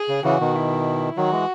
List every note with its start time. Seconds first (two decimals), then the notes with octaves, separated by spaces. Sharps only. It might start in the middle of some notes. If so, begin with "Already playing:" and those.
Already playing: G#4
0.09 C#3
0.24 C#3 E3 F#4
0.40 B2 D#3
0.56 E4
1.17 D#3 F#3 F#4
1.32 E3 G#3